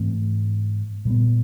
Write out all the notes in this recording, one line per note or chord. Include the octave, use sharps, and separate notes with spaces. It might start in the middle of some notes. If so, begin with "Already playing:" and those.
Already playing: G#2 E3 A3 C4
A#2 G3 B3